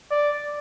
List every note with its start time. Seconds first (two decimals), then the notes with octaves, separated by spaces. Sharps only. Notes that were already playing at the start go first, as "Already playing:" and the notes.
0.11 D5